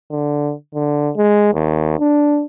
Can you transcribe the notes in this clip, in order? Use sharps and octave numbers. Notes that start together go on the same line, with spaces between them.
D3
D3
G#3
D#2
D4